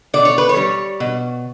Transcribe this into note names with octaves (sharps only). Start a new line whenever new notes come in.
B2 D5
C#5
B4
C#5
G3
B2